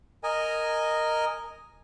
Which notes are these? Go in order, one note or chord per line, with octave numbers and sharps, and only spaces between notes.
A#4 D#5 G#5